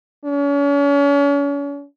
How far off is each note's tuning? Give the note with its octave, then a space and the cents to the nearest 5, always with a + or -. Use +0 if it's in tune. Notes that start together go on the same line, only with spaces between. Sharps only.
C#4 +40